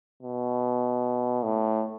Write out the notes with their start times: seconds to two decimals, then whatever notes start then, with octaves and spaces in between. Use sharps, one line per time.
0.23 B2
1.44 A2